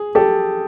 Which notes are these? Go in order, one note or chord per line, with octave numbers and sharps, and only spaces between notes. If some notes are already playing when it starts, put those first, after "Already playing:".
Already playing: G#4
G4 A4